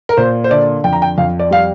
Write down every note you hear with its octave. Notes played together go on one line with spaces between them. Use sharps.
A#4
A#2 C5
C5
D3 D5
F2 G5
A#5
G5
F2 F5
D5
G3 F5